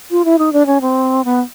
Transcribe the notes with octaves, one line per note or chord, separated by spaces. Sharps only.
F4
E4
D#4
D4
C#4
C4
B3